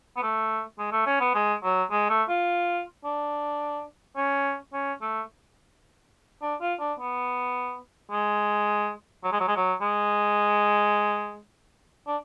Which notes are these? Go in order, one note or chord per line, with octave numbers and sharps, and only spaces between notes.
B3
A3
G#3
A3
C#4
B3
G#3
F#3
G#3
A3
F4
D4
C#4
C#4
A3
D4
F4
D4
B3
G#3
F#3
G#3
F#3
G#3
F#3
G#3
D4